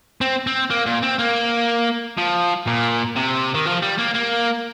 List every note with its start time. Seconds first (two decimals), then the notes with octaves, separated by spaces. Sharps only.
0.21 C4
0.47 C4
0.70 A#3
0.86 A#2
1.03 C4
1.19 A#3
2.18 F3
2.67 A#2
3.16 C3
3.54 D#3
3.66 F3
3.82 G3
3.99 A#3
4.15 A#3